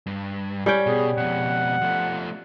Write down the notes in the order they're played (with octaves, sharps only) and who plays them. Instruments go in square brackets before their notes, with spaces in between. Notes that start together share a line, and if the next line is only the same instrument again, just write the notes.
[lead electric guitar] G2
[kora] G3 C#4 G5
[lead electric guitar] B2 [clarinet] G#4
[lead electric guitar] F2 B2 [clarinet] F#5
[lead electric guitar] F3 A3